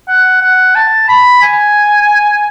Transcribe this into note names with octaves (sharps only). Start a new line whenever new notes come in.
F#5
F#5
A5
B5
G#5